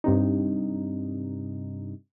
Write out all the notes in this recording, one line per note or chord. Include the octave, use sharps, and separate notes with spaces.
G2 C3 D#4